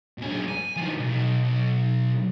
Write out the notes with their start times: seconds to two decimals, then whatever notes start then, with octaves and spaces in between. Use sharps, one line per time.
0.18 B1 G#4
0.48 G#5
0.77 D#3 F3
0.99 B1